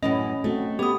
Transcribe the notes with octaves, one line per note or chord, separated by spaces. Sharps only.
F#2 A2 E3 C#4 D#5
A3 C4 F#4
B3 G4 D#6